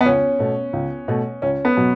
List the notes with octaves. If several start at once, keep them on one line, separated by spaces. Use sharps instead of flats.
B3
C#2 C#4
B2 A3
C#2
B2 A3
C#2 C#4
B3
B2 F#3